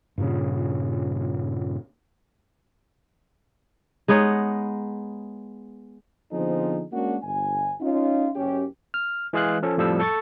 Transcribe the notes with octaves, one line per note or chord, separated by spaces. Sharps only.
G2 A#2 C#3
G#3 B3 D#4 C#5
D3 F3 B3 C4 D#4 G#4
G#3 A#3 C#4 D4 F#4
G1 G#5
C#4 D#4 F4
F#1 C#4 G4
F6
E3 G#3 G#4 F5 F#6
F3 C#4 A4
F2 A2 F3 G3 A4 E6
A4 C#6 A6